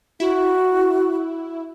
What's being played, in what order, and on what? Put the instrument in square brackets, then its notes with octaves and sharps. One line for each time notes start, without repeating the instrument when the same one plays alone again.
[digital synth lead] E4 [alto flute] F#4